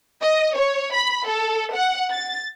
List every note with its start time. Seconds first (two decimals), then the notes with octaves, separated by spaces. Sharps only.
0.22 D#5
0.56 C#5
0.94 B5
1.27 A4
1.74 F#5
2.11 A6